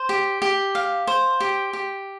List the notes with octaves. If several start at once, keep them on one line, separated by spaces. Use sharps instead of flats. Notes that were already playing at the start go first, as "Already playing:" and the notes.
Already playing: C5
G4
G4
F5
C5
G4
G4